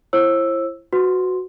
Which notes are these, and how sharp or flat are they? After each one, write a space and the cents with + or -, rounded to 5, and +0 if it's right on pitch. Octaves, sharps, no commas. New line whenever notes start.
E4 +30 C5 +40 E6 +0
F#4 +0 B4 +25 C6 +0